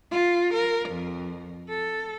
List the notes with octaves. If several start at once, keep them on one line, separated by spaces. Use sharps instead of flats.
F4
A#4
F2
A4